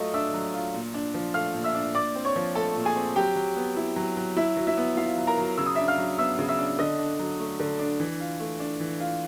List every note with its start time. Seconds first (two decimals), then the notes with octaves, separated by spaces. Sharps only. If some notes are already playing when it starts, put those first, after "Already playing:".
Already playing: F#3 A3 F4 D#5 D#6
0.14 D4 E5 E6
0.34 F#3
0.54 F4
0.74 A#2
0.94 D4
1.14 F3
1.34 A3 F5 F6
1.54 A#2
1.64 E5 E6
1.75 D4
1.95 A#2 D5 D6
2.15 C4
2.25 C#5 C#6
2.36 F3
2.55 A3 A4 A5
2.75 A#2
2.85 G#4 G#5
2.96 C4
3.16 F#3 G4 G5
3.36 F#3
3.56 B3
3.77 E4
3.96 F#3
4.17 F#3
4.36 F#3 E4 E5
4.57 F#3
4.67 E4 E5
4.77 B3
4.97 E4 F4 F5
5.18 F#3
5.27 A#4 A#5
5.38 F#3
5.58 C#3 E6
5.66 D#6
5.75 D4 E5 E6
5.88 F5 F6
5.98 F#3
6.18 B3 E5 E6
6.39 C#3
6.48 E5 E6
6.59 D4
6.79 D3 D#5 D#6
6.99 D4
7.19 F#3
7.39 A3
7.60 D3
7.79 D4
8.00 E3
8.20 F4
8.40 A3
8.60 D4
8.80 E3
9.00 F4